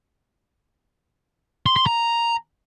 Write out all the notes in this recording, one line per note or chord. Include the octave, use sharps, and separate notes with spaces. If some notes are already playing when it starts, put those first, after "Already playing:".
C6
C6
A#5